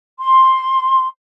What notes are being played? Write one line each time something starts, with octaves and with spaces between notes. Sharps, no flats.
C6